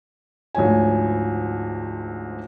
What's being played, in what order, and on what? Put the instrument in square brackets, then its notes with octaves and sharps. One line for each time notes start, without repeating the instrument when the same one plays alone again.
[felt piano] D2 G#2 F3 C#5 G#5